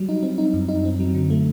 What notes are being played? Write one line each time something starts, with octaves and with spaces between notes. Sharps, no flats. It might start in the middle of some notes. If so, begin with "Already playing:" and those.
Already playing: F#3 G3
D#4
C4
D#4
F#2
D#4
C4
F#3
D3
A3